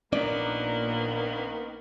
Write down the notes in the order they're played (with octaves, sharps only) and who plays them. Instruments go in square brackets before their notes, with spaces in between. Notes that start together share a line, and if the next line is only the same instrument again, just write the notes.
[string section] A#1 A#2 [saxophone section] D#3 A#3 B3 [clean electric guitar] C#4 D4 D5